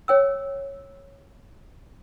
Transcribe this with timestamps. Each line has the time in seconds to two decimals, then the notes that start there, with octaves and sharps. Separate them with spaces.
0.08 C#5 G5 E6